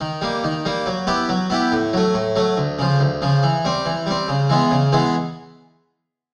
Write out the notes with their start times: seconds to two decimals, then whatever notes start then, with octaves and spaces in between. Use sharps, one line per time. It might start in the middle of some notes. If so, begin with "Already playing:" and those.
0.01 D#3
0.21 G3 A#3
0.44 D#3
0.65 G3 A#3
0.86 F#3
1.07 B3 E4 G4
1.29 F#3
1.50 B3 E4 G4
1.72 A2
1.93 F#3 A3
2.14 A2
2.36 F#3 A3
2.57 D2
2.79 C#3 F3
3.00 D2
3.22 C#3 F3
3.43 E3
3.65 G3 C4
3.86 E3
4.06 G3 C4
4.28 C#3
4.49 E3 G#3 B3
4.71 C#3
4.93 E3 G#3 B3